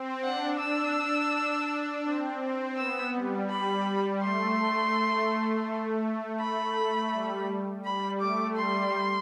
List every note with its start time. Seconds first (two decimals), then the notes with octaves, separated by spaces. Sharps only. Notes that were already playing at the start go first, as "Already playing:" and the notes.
Already playing: C4
0.24 D4 F#5
0.60 D4 E6
2.05 C4
2.41 C4
2.77 B3 E6
3.14 G3
3.50 G3 B5
4.22 A3 C6
6.40 B5
7.12 G3
7.85 G3 B5
8.21 A3 D6
8.57 G3 C6